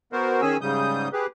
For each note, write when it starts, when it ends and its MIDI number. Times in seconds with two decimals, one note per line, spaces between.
0.12 0.41 59
0.12 0.41 66
0.12 0.41 70
0.12 0.41 72
0.42 0.57 51
0.42 0.57 61
0.42 0.57 68
0.42 0.57 80
0.42 0.57 88
0.61 1.09 44
0.61 1.09 49
0.61 1.09 55
0.61 1.09 87
0.61 1.09 91
1.13 1.27 67
1.13 1.27 68
1.13 1.27 71